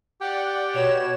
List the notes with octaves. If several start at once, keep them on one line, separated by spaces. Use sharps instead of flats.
G4 D5 F#5 G5
B2 F#4 C#5 E7